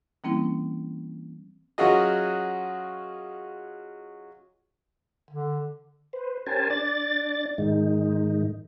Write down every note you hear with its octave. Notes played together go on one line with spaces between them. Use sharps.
E3 G3 A#3 C4 C#4 E4
F#3 C#4 F4 F#4 G#4 D#5
D3
B4 C5
C#4 G4 A#4 C5 G#5 A5
D4 D5 A6
G#2 D#3 G#3 D#4